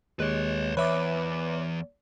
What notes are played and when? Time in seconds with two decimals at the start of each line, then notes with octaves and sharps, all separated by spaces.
0.20 D#2 G#3 B4 C#5 F#6
0.77 E2 B4 C#5 E5 D6